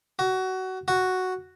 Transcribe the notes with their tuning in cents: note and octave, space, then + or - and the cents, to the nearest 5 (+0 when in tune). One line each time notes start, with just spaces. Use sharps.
F#4 +20
F#4 +0